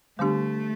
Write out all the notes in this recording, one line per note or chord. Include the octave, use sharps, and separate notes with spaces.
D3 G3 A3 B3 D4 G4